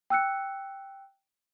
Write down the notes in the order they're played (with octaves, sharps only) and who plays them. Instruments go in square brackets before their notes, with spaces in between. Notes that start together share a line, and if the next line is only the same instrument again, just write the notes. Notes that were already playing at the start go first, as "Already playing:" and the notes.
[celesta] G5 E6 F#6 C#7